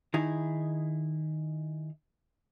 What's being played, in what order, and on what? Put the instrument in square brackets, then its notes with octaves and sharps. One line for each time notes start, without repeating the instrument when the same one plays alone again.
[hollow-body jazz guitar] D#3 D#4 E4 G#4